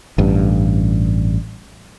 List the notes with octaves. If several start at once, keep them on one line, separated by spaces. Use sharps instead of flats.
A1 G2